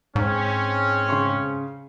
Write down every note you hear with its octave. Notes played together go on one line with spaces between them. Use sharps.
G#2 G#3 C4 C#4
C#3 C6 C#6